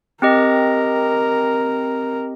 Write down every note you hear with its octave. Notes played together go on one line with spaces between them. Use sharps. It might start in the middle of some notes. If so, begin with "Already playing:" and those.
C4 G4 A#4 D#5